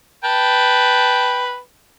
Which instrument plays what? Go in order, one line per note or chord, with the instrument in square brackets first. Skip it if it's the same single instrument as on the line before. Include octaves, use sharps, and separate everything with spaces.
[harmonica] B4 G5 A5